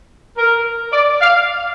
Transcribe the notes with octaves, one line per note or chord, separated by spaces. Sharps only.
A#4
D5
F5